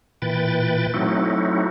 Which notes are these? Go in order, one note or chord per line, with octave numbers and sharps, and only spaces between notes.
A#2 E3 B4 G5 A6
F#3 A3 C4 D#4 E4 F#4